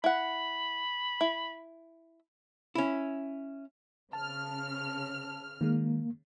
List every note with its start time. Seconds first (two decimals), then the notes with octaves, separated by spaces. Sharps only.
0.04 E4 F#5 B5
1.21 E4
2.75 C#4 E4
4.13 C#3 A5 F6
5.61 D#3 G#3 A#3